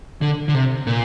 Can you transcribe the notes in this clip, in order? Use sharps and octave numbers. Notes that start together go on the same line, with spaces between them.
D3
D3
C3
A#2